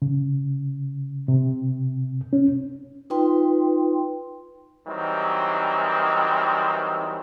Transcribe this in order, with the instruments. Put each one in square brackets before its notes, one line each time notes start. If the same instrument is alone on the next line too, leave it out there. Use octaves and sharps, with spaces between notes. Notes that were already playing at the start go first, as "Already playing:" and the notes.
[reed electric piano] C#3
C3
C#4
[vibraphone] D#4 F4 B4 G5 C6
[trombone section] D#3 E3 F#3 G3 C4